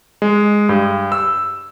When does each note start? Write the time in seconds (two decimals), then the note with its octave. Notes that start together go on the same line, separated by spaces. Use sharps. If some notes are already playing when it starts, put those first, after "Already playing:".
0.22 G#3
0.69 G2
1.12 E6